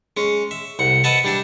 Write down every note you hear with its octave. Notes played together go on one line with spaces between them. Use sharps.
G#3 C#4
E5
C2 F#5
B4 D#5 E5 F#5 A5 B5
G3 D4 E5